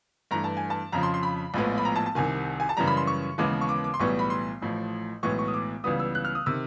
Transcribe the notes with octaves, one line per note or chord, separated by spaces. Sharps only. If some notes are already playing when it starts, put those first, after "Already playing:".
G2 E3 A3 A#5
A5
G#5
A5
F2 C#3 F3 A#5
C6
C6
B5
A#1 A2 F3 G#3 B3
B5
A#5
A5
A5
C2 C3 D#3 G#5
G#5
A5
F#2 C#3 E3 G3 A#5
B5
C6
C#6
D#2 C#3 E3 G#3 B3 D6
C#6
D6
D6
C6
B1 A2 E3 G3 B3 C#6
B5
C6
A1 A2 F3
B1 A2 E3 G#3 B3 C#6
C#6
D#6
D6
C#2 C#3 E3 G3 B3 D#6
E6
F#6
F6
D#6
C3 D#3 E6